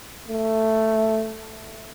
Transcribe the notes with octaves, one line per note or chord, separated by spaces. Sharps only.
A3